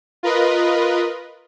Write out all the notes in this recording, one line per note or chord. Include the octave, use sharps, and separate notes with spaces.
F4 A#4 B4 D#5